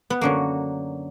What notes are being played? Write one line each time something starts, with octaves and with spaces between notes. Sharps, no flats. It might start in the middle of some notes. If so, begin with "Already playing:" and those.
B3
F#2 D3 F#3 A#3